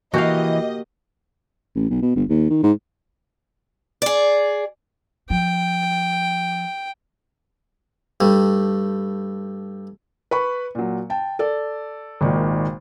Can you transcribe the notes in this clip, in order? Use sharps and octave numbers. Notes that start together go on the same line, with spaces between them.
E3 A#3 F#4 G4 D#5 F5
A1
B1
B2
G1
D#2
D#3
G#2
G#4 D5
F3 G5
G2 G3 A3
B4 B5 C#6
A#2 F#3
G5 A5
A4 D5
G#1 A#2 D#3